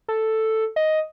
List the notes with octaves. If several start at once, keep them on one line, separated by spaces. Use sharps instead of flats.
A4
D#5